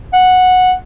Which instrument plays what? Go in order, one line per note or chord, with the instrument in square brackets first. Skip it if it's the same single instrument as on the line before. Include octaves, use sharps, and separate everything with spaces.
[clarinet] F#5